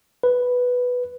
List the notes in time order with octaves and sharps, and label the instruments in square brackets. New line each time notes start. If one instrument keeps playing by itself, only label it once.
[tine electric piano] B4